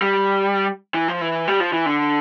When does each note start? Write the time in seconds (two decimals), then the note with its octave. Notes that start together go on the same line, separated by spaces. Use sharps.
0.02 G3
0.94 E3
1.08 F3
1.21 E3
1.48 G3
1.60 F3
1.73 E3
1.86 D3